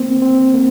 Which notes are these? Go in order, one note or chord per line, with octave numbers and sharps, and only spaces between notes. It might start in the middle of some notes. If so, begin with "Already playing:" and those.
Already playing: A#3 C4
C4
A#3